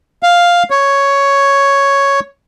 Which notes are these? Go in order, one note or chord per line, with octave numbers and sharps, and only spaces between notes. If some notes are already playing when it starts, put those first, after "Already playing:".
F5
C#5